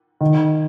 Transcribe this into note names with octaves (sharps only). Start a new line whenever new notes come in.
D#3